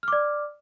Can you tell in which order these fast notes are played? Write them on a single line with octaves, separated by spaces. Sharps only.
F6 D6 D5